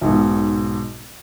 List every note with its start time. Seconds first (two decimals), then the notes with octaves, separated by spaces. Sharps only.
0.01 B1 G#2 B2